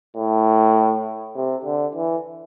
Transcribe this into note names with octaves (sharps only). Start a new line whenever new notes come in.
A2
C3
D3
E3